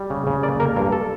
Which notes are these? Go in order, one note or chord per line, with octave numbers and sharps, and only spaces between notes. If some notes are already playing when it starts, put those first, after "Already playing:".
Already playing: G3
C#3
C#3
A#3 D5
A#3 A#4
G2 A#4
A4